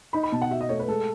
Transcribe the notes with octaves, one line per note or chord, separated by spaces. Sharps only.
D#4 B5
B5
B2 A5
F#5
F#4 E5
D#5
A3 C#5
B4
G#3 A4